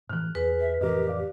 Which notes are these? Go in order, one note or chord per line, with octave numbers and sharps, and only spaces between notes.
A2 E3 F6 F#6
E2 G#4 B4
E5
F2 A2 E3 G4 A#4 D#5
D5 F5